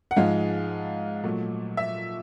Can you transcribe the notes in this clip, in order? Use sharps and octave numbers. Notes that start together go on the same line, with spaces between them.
F#5
G#2 F3 G#3 F5
A#2 F#3 A3
E5